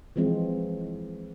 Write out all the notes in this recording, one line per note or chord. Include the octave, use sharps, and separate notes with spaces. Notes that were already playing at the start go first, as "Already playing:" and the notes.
E3 F3 G#3 C4